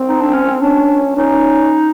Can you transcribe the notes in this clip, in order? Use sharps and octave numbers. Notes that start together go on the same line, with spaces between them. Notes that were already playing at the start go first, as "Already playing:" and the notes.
Already playing: C4
D#4
D4
C#4
C#4 D4
C#4 D#4